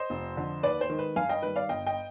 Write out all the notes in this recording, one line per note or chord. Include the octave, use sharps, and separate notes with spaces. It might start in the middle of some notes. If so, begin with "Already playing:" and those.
Already playing: C5 D#5
F1
F2 D3 F3
D#2 B4 D5
C5
D#3 G#3
B4
G2 F5 G#5
D#5 G5
D#3 G3 B4
D5 F5
G1 D#5 G5
D#5 G5